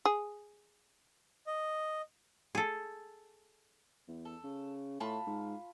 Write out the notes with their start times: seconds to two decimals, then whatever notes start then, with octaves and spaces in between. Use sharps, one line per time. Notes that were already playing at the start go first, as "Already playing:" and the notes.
0.05 G#4
1.47 D#5
2.55 G#4 A4
4.08 E2
4.25 A4
4.44 C#3
5.00 A2 F4 A5 B5
5.27 G#2